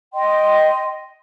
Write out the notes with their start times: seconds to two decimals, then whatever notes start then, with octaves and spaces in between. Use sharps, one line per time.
0.14 D#5 G5 C6